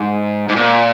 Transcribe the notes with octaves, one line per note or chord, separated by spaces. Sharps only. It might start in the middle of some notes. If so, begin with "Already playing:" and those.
Already playing: G#2
G#2
A#2